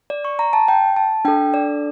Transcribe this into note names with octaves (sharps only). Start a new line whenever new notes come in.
D5
C#6
A#5
A5
G5
A5
D4 A4 G5
D5